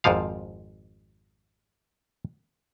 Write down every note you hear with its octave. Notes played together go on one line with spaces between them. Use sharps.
G#1 F2 G#2 F3 F5